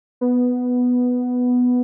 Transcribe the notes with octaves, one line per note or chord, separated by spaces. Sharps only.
B3